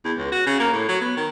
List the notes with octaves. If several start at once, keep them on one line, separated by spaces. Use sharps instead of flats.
E2
C#2
F#4
C#3
A#3
A2
F#3
B3
D#3